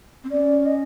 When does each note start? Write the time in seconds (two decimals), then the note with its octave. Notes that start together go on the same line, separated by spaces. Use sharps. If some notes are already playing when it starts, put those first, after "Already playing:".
0.23 C4
0.31 C#4 D5
0.66 D#5